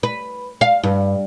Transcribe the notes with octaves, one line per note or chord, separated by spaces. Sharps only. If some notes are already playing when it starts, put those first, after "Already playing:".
B4
F5
G2